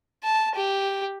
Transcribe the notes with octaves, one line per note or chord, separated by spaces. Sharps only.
A5
G4